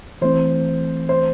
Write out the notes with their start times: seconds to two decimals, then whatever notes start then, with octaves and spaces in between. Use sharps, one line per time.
0.22 E3 A3 C4 C5
1.09 C5